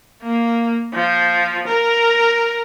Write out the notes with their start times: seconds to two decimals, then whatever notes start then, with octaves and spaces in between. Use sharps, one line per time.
0.23 A#3
0.93 F3
1.67 A#4